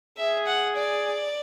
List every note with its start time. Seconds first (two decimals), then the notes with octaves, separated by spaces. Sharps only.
0.17 G#4 E5
0.47 F#5
0.76 D5